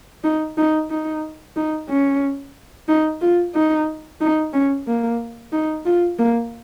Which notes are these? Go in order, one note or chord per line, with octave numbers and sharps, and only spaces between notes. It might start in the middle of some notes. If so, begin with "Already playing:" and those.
D#4
D#4
D#4
D#4
C#4
D#4
F4
D#4
D#4
C#4
A#3
D#4
F4
A#3